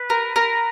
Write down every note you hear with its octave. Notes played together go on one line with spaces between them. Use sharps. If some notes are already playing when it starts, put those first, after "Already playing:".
Already playing: B4
A#4
A#4